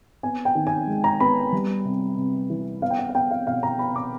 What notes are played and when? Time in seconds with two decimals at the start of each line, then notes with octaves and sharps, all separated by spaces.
0.23 B3 G#5
0.45 G5
0.55 D#3
0.67 G#5
0.87 G#3
1.04 A#5
1.20 B3 B5
1.53 G3
1.85 C3
2.17 C3
2.50 E3
2.82 B3 F5
2.90 G5
2.99 F#5
3.09 F#5
3.15 B3 G5
3.31 F5
3.47 B2 F5
3.63 A#5
3.79 B3 B5
3.96 D6